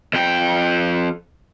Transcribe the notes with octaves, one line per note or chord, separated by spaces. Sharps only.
F2 G5